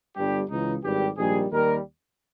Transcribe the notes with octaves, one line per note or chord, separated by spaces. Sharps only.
G1 G2 G3 G4
C#2 C#3 E3 D#4
G#1 G2 G3 G4
A#1 G#2 D#3 G3 G#4
D#2 D#3 G3 A#4